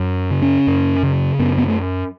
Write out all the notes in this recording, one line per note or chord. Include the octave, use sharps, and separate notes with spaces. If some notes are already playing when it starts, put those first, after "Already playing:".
Already playing: F#2
C#3
C#4
F#2
C#3
F#2 B3
B3
A3